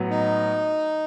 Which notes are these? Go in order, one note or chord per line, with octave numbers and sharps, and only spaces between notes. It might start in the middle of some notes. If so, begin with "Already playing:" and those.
Already playing: A2 F#3 B3
D#4